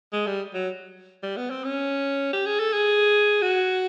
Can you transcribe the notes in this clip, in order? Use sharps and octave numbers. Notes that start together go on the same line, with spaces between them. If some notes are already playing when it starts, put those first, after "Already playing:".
G#3
G3
F#3
G3
B3
C4
C#4
G4
G#4
A4
G#4
F#4